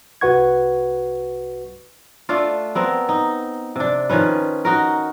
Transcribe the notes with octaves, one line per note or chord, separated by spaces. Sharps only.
C2 F#4 B4 F#5 C#6 G#6
A3 D4 F4
B3 C4 A#4
D#4
C3 D4
D#3 F3 C#4 B4
D#4 F#4 A#4